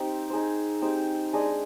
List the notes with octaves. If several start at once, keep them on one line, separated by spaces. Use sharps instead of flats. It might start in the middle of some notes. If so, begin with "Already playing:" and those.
Already playing: C4 D#4 G4
D#4 G#4 C5
C4 D#4 G4 C5
G#3 D4 G#4 D#5